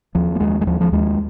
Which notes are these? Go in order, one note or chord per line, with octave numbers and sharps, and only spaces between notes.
D#2 F3
A#3
D#2 G#3
G#3
D#2 F3
F3
D#2 G#3